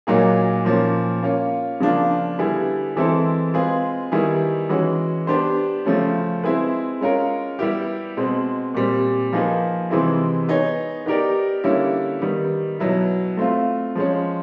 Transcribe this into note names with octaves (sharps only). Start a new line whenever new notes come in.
A#2 F#3 A#3 D#4 G#4
A#2 F3 A#3 C#4
A#3 C#4 F4
C#3 F3 A#3 D4 F4
D3 G3 B3 E4 G#4
E3 G#3 C4 E4 A4
G#3 C4 F4 G#4 B4
D#3 G3 B3 E4 G#4
E3 G#3 C#4 F#4
B3 D4 G4 C5
C#3 F3 A3 C#4
G#3 C4 E4 G#4 B4
G#3 C#4 F4 A#4
G3 B3 E4 G4
B2 G#3 C4
A#2 G3 C4
F3 A#3 D#4 G#4 B4
C3 E3 G#3 C4 E4
B3 D#4 G#4 C#5
B3 D#4 G4 A#4 D5
D3 G3 A#3 C#4 E4
D#3 G3 B3
B2 F#3 B3 E4
A3 C4 F4
F3 G#3 C#4